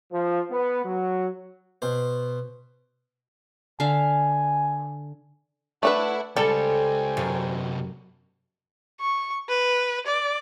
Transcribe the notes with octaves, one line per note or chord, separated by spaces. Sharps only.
F3
B3
F#3
B2 C5
D3 E5 F5 G#5
A3 D4 B4 E5 F#5 B5
C#2 G3 C#4 A4 C5 G5 G#5
F#2 C3 B3
C#6
B4
D5